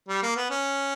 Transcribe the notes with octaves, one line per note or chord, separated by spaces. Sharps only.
G3
A#3
B3
C#4